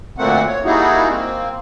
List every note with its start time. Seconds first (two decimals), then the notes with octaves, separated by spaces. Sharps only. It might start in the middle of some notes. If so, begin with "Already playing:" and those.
0.18 D2 A#2 A3 A#3 C4 F#5
0.47 C#5
0.65 G3 A#3 D#4 E4 F#4 G#4
1.09 A#3 C4